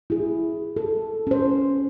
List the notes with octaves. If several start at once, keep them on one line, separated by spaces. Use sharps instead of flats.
E4 G#4
A4
C#4 C5